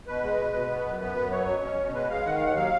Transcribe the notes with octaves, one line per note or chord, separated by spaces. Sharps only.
B2 B4
G#3
B2
B2
B3
F#2
B3 B4
F#2
F#3 C#5
B2
C#4
B2
G#3 B4
G#3 F5
D#3 F#5
F5
D#2 F#5
F#3 F5